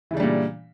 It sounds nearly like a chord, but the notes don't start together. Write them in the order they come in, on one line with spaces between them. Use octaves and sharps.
E3 C#3 D4 G3 A#2